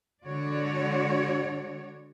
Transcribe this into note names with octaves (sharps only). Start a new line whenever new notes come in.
D3 G#3 F#4 C#5 D5